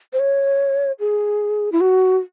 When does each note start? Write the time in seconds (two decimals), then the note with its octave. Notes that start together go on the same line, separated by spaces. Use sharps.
0.13 C5
0.20 C#5
1.00 G#4
1.72 E4
1.81 F#4